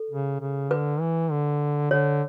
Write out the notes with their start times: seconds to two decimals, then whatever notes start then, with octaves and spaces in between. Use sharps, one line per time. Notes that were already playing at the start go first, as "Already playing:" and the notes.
Already playing: A4
0.11 C#3
0.41 C#3
0.71 D3 B4
1.01 E3
1.31 D3
1.91 D3 C#5